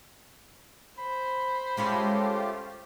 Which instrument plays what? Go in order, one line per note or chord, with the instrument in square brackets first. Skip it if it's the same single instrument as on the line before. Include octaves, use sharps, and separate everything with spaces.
[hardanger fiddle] C5 [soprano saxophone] B5
[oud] G#3 C#4 C#5 [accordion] A3 F4 G4